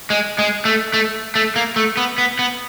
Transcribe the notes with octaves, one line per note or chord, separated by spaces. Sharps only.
G#3
G#3
A3
A3
A3
A#3
A3
B3
B3
B3